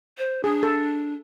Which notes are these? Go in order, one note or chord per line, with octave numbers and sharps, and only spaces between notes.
C5
D4 G#4
A4